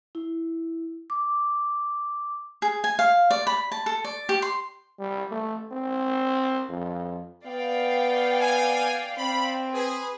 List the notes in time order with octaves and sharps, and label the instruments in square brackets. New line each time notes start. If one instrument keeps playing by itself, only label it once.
[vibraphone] E4
D6
[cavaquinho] G#4
G#5
F5
D5
B5
A5
A4
D5
G4
C6
[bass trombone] G3
A3
C4
F2
[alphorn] B3 [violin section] D5 F5 G5
[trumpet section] G#5
[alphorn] C4 [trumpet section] B5
[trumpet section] G#4 [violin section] B4